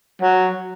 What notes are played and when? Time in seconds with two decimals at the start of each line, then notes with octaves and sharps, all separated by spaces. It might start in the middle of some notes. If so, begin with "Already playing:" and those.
0.21 F#3